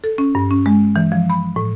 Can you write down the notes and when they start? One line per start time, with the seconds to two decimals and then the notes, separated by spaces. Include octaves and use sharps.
0.04 A4
0.18 C#4
0.35 G2
0.51 C#4
0.66 G#3
0.96 E3
1.12 F3
1.30 B5
1.56 A2